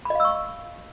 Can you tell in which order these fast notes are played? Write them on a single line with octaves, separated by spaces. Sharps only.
B5 D#5 F5 E6 C#6